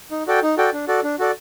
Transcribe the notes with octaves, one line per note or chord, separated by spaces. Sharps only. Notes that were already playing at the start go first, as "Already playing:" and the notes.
D#4
F#4 A4 D5 G5
D#4
F#4 A4 D5 G5
D4
F#4 A4 D5
D4
F#4 A4 D5